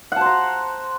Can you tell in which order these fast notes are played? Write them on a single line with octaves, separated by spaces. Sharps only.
F#5 A5 C5 A#5